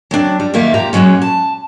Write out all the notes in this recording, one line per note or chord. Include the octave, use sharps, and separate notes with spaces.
F#3 C4 D4
G3
E2 D#3 A#3 E5
A#2 F3 G4 A#5
A#2 C#3 F#3 G#3 C#4
A5